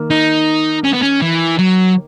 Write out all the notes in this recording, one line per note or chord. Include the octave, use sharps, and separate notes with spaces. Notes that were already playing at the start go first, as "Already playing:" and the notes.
Already playing: D#3 A#3
D#4
C#4
B3
C#4
E3
F#3